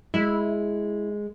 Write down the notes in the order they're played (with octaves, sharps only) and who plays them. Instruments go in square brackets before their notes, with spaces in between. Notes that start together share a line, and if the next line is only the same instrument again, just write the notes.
[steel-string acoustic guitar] G#3 [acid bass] E4